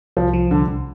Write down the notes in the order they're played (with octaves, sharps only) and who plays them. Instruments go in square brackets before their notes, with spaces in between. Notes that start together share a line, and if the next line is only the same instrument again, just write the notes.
[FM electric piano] C2 [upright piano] F3
[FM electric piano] F3
[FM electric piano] C2 [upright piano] D3
[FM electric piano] C2